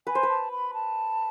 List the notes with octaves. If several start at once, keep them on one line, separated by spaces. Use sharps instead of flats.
B4 G#5
C5
B4
A5
B5
A5